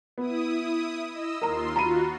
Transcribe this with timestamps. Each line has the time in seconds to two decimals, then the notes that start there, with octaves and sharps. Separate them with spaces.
0.18 B3 E4 D#6
1.09 D#5 E6
1.42 D#2 F4 A#4 A#5 C6
1.76 F4 F#4 A#5 B5 D#7